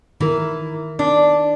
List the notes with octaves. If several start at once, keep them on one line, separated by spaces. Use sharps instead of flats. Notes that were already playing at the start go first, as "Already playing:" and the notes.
D#3 E3 E4 A#4
D4 D#4